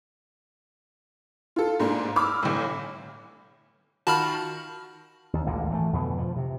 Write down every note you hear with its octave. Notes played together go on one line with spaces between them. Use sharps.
F4 A4
G#2 A#3 D4
B5 D6 E6 F6
G1 A2
D#3 F4 F#4 A5 B5 F6
D#2
G#1 D2 A#2 D3
E3 F3 A3
F2 B2 D3
F3
C3